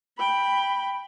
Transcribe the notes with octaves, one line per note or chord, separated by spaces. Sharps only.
G5 B5